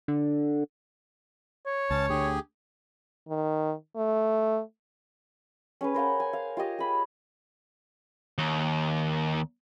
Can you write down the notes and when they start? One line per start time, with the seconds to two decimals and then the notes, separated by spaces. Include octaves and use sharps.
0.08 D3
1.66 C#5
1.91 C#2 C#4 A5
2.10 D2 D3 G4 G#4
3.29 D#3
3.96 A3
5.81 C#4 G#4 B4
5.94 A#4 C5 F5 F#5
6.20 G#5
6.33 F5
6.57 F4 G4 C#5 D#5
6.78 G#4 B5
8.38 D#2